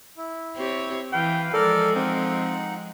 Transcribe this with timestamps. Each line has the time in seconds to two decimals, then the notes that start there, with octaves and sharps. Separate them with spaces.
0.17 E4
0.56 C4 G4 C#5
1.12 E3 B4 F5 G5
1.53 F3 G#3 A4 A#4 D5
1.95 C4 D#4 F#5